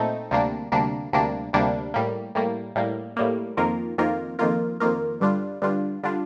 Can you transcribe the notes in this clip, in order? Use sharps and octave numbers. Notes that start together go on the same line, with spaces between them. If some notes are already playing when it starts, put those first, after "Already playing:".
Already playing: A#2 A3 C4 D#4 A4
D2 C3 G3 A#3 D4
D2 C3 G3 A#3 D4
D2 C3 G3 A#3 D4
D2 C3 G3 A#3 D4
A2 G3 A#3
A2 G3 A#3
A2 G3 A#3
A2 G3 A#3
F2 D#3 A#3 F4 A#4
F2 D#3 A#3 F4 A#4
F2 D#3 A#3 F4 A#4
F2 D#3 A#3 F4 A#4
G2 D3 G3 D4 F4
G2 D3 G3 D4 F4
D3 G3 D4 F4